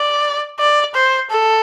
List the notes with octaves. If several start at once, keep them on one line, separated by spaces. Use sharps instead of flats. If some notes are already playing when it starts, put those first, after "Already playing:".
Already playing: D5
D5
C5
A4